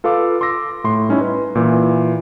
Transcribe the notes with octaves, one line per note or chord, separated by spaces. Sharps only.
F4 A4 B4 F5 D6
C6 D6 E6 A#6
A2 C6
G3 C#4 D#4 E4
B4
A#2 E3